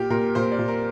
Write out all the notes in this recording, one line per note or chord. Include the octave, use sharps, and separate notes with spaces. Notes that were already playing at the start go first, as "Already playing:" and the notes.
Already playing: A#2 G4
A#2 A#4
A#2 C5
D5
A#2
A#4